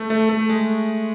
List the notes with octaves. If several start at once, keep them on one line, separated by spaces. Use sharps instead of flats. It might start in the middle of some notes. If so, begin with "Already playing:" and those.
Already playing: A3
A3
A3
G#3